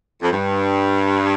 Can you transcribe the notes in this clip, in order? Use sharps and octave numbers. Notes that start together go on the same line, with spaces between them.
F2
G2